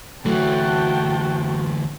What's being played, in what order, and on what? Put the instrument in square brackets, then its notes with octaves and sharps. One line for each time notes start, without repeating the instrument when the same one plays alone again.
[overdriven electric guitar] D2 E3 [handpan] F#3 A3 [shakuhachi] F#4 [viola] G5 A5